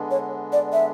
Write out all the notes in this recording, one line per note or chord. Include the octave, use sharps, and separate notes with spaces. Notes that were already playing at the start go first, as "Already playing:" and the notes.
Already playing: D3 G#3 B3 D4
C#5
D5
E5